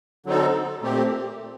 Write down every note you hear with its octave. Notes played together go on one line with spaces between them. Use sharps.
D3 F#3 C4 D#4 A4
A#2 A3 C4 G4